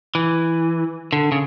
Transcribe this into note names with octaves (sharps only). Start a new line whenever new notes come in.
E3
D3
C#3